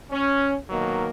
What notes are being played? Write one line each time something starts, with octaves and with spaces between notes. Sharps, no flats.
C#4
B2 D#3 F#3 A#3